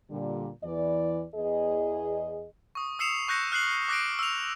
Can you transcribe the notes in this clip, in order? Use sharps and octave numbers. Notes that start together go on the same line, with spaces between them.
A#2 D3 G3
E2 E3 D5
E2 G#4 D#5
C#6 D#6
D#6 E6 C7 C#7 E7 F7
C#6 F#6 G6 A#6 C#7
F6 F#6 C7 F#7
D6 F#6 A#6 C7 D7
E6 F7